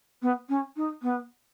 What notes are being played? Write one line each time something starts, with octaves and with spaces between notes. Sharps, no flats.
B3
C#4
D#4
B3